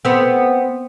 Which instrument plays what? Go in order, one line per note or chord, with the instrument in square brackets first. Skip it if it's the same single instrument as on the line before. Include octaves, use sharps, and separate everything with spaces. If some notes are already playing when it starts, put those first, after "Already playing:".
[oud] B3 C4